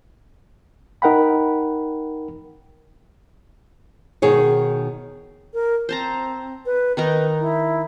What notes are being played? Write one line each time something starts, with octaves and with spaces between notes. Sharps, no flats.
D#4 A#4 F#5 G5 B5
B2 D#3 G#4 C#5
A#4
C4 C5 A5 A#5
B4
D#3 D#4 A#4 B4
E4